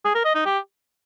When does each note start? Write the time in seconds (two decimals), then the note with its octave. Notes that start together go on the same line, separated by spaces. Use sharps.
0.05 G#4
0.15 A#4
0.25 D#5
0.35 D#4
0.45 G4